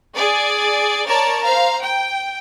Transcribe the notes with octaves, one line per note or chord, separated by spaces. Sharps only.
G#4 D5
A#4 C#5 D5 A5 A#5
C5 F5 A#5
G5